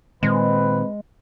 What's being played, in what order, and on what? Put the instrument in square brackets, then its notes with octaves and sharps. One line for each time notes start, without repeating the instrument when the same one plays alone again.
[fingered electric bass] A#2 D#3 [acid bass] G#3 [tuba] C4 [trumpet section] B4